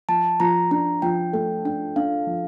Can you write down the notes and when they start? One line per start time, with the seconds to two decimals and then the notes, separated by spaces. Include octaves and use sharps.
0.08 F3 A5
0.40 F3 A#5
0.71 D4 A#5
1.02 F3 G5
1.33 A3 G5
1.65 D4 G5
1.96 D4 F5
2.27 F3